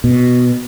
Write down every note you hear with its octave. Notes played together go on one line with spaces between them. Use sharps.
B2